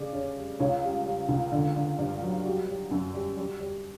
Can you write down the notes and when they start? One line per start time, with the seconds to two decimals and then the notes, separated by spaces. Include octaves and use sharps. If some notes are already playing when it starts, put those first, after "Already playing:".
Already playing: C#3 D5
0.13 C#4
0.37 G3
0.60 C#2 C#5
0.83 G3
1.06 G3
1.29 C#2
1.52 D3
1.76 D3
1.98 G2
2.22 F#3
2.45 G3 F#4
2.68 G3
2.91 F#2
3.14 G3
3.37 G3
3.60 G3